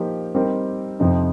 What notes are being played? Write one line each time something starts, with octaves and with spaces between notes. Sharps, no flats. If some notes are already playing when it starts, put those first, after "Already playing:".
Already playing: F3 A#3 D#4 G4
G3 C4 D#4 G4 A#4
F2 C3 F3 C4 D#4